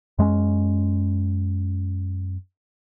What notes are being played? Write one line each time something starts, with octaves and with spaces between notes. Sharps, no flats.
F#2 G#3 A3 C#4